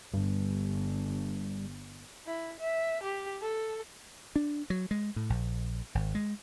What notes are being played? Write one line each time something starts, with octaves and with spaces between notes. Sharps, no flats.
G1 G2
E4
E5
G4
A4
D4
F#3
G#3
A2
A#1
G#1
G#3